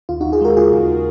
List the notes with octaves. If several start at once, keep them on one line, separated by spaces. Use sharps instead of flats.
D#2 F4
D#4 F#4
D#2
F4 G#4
G#3 F#4 A#4
C#3 F4 G#4
D#2